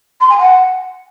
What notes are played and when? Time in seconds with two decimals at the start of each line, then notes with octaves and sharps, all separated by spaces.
0.20 C6
0.30 G#5
0.39 F#5